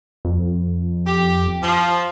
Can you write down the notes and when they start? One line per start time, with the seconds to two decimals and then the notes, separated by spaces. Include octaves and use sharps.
0.25 F2
1.06 G4
1.62 F3